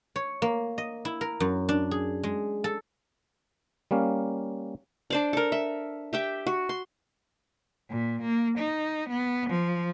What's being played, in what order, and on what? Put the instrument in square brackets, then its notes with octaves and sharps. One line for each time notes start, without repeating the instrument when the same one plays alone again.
[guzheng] C#5
A#3
D#5
E4
A#4
F#2
D4
G#4
G#3
A4
[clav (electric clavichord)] G3 A#3 C#4 F5
[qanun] D4 C5 D5
A4 A#4
E5
G4 E5 G5
F#4
C6
[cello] A#2
A#3
D#4
B3
F3